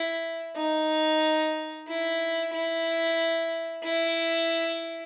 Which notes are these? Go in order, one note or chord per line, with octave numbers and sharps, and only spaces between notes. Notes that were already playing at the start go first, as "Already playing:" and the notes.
Already playing: E4
D#4
E4
E4
E4